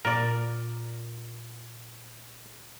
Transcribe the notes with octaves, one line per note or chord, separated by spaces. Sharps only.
A#2 A#4 D5